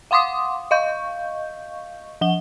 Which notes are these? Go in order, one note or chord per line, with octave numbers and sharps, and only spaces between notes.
F5 F#5 C6 D6 D#6
D#5 F5 C#6 G6
F3 F#5 G7